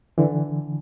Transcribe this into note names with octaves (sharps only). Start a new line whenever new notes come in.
D3 E3